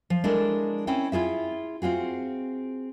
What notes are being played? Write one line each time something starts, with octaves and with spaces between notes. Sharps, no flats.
F3
G#3 D4 E4 A4 A#4
C4 C#4 E4 G5
E4 F4 G#4 E5
C4 F4 F#4 G#4